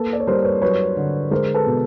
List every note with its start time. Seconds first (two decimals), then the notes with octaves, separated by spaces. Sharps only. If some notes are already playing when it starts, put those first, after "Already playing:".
Already playing: A#3 A4 B4
0.13 D5
0.20 C#5
0.27 G3 A#4 C5
0.44 B4 C#5
0.62 F#3 B4 C#5
0.97 D3
1.31 G#3 A#4 C5
1.54 A4 B4
1.66 B2